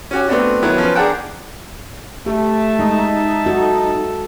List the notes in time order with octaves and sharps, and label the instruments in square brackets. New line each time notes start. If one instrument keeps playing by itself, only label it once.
[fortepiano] C#4 F#4 G4
A3 B3 C4 D4 F#4
D#3 F#3 B3 E4
F3 C#4 B4
D4 G#4 A#4 F#5 G5 A5
[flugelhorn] A3 [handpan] G4 [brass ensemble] E5 A5
[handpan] G#3 [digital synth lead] D#4
[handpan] F#4 [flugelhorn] A4